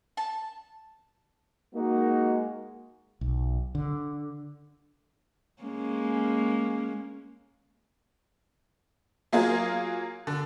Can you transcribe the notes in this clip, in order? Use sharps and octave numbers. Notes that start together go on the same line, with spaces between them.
A5
G#3 A#3 D#4 F#4
B1
D3
G#3 A#3 C#4
F#3 A#3 F4 G#4
D3